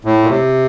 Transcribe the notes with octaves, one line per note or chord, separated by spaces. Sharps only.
A2
A#2
C3